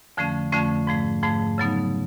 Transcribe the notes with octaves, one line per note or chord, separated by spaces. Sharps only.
F2 D3 F3 A3 C#4
F2 D3 F3 A3 C#4
G#2 F3 A3
G#2 F3 A3
C#3 F#3 B3 D#4